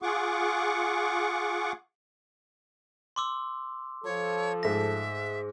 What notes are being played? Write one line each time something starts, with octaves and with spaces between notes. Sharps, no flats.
F4 G#4 F#5 C#6 D6
C6 D6 E6
F3 A4 C#5
G#2 A3 E5 A#6